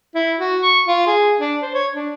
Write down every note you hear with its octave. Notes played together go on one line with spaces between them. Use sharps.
E4
F#4
C#6
F4
G#4
D4
C5
C#5
D4